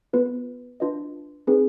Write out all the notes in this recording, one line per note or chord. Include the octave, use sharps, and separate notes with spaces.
B3 F4 B4
D4 F4 B4 D#5
C4 D#4 G#4 B4